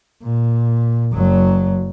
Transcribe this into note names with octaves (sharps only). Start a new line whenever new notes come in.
A#2
F#1 F#3